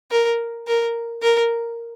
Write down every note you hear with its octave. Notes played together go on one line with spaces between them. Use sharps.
A#4
A#4
A#4